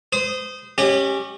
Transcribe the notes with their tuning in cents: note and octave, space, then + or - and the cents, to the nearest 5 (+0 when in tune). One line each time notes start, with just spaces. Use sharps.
C5 -30 D#6 -5
C#4 -15 G4 +0 D#5 -35